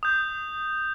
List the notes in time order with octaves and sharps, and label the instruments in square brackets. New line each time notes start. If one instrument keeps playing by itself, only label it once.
[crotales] D#6 G6